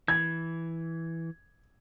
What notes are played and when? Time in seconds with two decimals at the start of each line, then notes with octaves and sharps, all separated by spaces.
0.08 E3 G#6